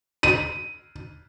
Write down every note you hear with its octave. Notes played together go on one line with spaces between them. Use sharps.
D#7